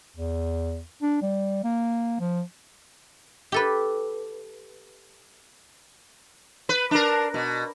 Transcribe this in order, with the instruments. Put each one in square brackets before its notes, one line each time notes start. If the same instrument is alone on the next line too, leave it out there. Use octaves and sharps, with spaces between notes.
[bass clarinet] E2
D4
G3
A#3
F3
[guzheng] G4 A4 B4
[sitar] B4
D4 A#4
B2